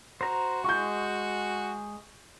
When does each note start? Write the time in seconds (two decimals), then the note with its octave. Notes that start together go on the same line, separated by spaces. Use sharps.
0.21 F#4 C5 A#5
0.64 G#3 C#6 G6